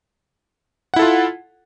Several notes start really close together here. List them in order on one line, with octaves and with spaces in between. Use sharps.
F#5 E4 A4 F4